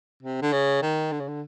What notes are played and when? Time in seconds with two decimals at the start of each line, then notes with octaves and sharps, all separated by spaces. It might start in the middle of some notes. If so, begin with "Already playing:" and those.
0.22 C3
0.42 D3
0.53 C#3
0.82 D#3
1.12 D3
1.20 C#3
1.28 D3